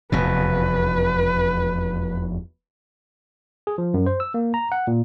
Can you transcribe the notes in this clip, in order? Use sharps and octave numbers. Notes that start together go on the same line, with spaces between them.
F1 E2 B2 B4
G#4
F3
F#2
C5
E6
A#3
A#5
F#5
A#2